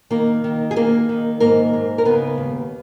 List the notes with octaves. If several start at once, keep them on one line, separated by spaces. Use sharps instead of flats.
D#3 A#3 A#4
D#3
G#4
D#3 A#3 A#4
D#3
G#2 A#3 A#4
G#2
A#4
C#3 B3 B4
D#2